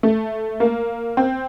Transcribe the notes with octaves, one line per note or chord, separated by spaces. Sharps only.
A3
A#3
C4